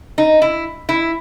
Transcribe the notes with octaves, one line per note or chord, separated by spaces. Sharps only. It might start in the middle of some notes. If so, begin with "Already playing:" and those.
D#4
E4
E4